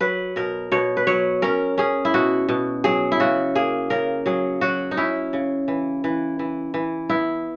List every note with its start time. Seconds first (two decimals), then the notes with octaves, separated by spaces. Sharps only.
0.01 F#3 B4
0.36 B2 A#4
0.72 B2 C#5
0.97 B4
1.07 F#3 C#5
1.42 C#4 A#4
1.78 C#4 G#4
2.05 E4
2.14 B2 F#4
2.49 B2
2.84 F#3 G#4
3.12 E4
3.20 C#3 F#4
3.55 A#3 G#4
3.90 C#3 A#4
4.26 F#3 G#4
4.61 F#3 F#4
4.91 D#4
4.97 C#4 E4
5.33 C#3
5.68 E3
6.04 E3
6.39 E3
6.74 E3
7.10 B3 E4